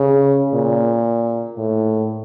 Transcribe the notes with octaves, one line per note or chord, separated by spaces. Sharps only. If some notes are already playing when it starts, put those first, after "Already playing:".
Already playing: C#3
A#2
A2